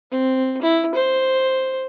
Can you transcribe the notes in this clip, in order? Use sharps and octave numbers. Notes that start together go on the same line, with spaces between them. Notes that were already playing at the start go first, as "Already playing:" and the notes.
C4
E4
C5